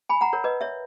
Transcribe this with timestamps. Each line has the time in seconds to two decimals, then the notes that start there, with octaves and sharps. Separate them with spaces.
0.09 G#5 B5
0.21 F#5 A#5
0.33 A#4 C#5
0.44 B4 D#5
0.61 C#5 E5